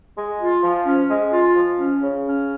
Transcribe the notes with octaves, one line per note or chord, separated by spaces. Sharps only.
G#3
F4
F3
C#4
G#3
F4
F3
C#4
C#3
C#4